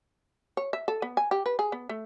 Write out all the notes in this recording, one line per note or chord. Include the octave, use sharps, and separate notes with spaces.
C#5
E5
A4
B3
G#5
G4
B4
G#4
B3
A3